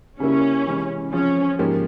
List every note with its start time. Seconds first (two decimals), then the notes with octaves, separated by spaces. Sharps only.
0.20 C#3 G3 A#3 C#4 E4
0.66 C3 E3 G#3
1.13 F3 C4 C#4 F4 G#4
1.59 G#2 F3 A#3 C#4 G4